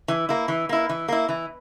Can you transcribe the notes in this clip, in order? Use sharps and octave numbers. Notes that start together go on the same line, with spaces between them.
E3
A#3 E4
E3
A#3 E4
E3
A#3 E4
E3